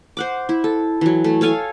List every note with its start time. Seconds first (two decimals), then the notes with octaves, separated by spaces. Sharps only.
0.17 C5 F#5 D6
0.49 E4
0.64 A4
1.01 E3 F#3
1.24 A3
1.41 A4 C#5 F5 G#5